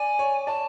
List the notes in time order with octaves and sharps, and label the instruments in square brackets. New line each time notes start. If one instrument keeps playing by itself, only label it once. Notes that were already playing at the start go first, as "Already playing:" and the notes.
Already playing: [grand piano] D5 [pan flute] G#5
[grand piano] C#5
[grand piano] D5 [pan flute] A5